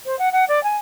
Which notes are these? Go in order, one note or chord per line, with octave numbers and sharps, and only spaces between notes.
C5
F#5
F#5
D5
G#5